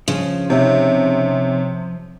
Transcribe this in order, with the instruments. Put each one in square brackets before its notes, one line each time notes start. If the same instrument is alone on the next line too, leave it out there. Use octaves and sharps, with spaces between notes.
[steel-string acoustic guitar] C#3 [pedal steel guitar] F3
[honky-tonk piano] C3 [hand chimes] D#4 C#5 E5